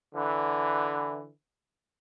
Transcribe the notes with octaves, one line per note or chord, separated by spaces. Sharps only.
D3 E3